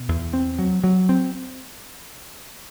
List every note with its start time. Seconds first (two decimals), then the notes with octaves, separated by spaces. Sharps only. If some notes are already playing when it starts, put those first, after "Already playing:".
Already playing: B2
0.08 E2
0.33 C4
0.59 F#3
0.84 F#3
1.09 C4